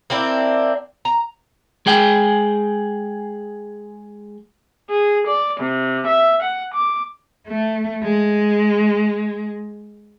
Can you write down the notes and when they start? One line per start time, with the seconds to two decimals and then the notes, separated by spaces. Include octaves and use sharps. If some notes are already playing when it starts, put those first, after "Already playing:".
0.10 A#3 C4 D4 E4
1.05 A#5
1.86 G#3 G#4 G5
4.89 G#4
5.25 D5
5.58 C3
6.06 E5
6.41 F#5
6.72 D6
7.48 A3
8.03 G#3